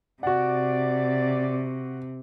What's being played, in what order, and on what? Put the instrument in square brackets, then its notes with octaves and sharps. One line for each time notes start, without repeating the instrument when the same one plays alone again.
[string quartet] C3 [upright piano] F#4 F#5 [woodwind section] D5